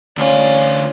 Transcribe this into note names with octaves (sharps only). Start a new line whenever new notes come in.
D2 C#4 F4 D5